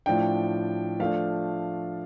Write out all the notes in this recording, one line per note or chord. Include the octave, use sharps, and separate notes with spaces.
A2 F3 D4 G5
F3 A3 D4 F5